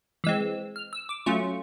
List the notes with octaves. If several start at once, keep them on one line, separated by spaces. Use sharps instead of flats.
E3 G#3 C4 E6
F6
E6
D6
F#3 A3 C#4 F4 C#6